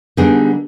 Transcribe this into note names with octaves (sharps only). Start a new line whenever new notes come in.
D3 G3 B3 D#4 G#4